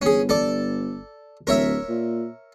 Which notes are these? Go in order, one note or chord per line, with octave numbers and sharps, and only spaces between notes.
G1 C#4 G#4
A4 D5
D1 A#4 C#5 E5
A#2